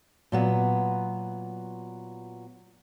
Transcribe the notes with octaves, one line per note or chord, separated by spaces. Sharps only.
A#2 F#3 B3